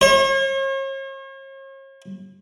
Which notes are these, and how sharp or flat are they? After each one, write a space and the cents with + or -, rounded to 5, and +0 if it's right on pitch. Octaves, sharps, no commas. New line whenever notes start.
C#5 -45